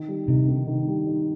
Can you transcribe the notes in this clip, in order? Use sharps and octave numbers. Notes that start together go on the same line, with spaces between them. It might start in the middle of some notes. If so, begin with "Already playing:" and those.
Already playing: D#3
G3
C3 D#4
D#3
D#3
G3
D#4